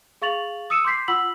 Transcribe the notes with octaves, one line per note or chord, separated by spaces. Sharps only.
G#4 F5 C#6 A6 F7 F#7
D#6 E6 C#7 D#7 E7
C6 D6 G6 B6 C7
F4 F#5 B5 E6 B6 F#7